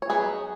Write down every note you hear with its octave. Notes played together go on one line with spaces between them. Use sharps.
C#5
F#3 B3 D#4 G#4 B4